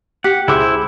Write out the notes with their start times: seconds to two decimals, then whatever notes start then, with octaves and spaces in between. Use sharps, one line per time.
0.24 G4 F#5
0.48 C#2 E4 G#4 C5 E5 D6